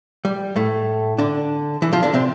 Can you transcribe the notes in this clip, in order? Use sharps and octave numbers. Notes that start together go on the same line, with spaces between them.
G3
A2 A3
D3 D4
E3 E4
F3 F4
D3 D4
C3 C4